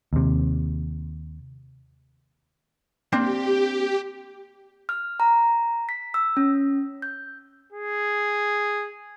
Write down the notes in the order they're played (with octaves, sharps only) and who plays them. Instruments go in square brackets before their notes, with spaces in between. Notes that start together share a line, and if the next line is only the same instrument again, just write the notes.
[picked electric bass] D#2 C3
[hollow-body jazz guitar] A#3 C4 D4 [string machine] G4
[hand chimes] F6
A#5
B6
E6
C#4
G6
[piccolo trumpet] G#4